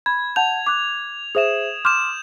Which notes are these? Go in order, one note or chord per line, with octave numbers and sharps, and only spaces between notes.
B5 G#6
F#5 A5 G6 F7
D6 F#6
G#4 C5 E5 D#6 E7
C6 D6 F6 G6 E7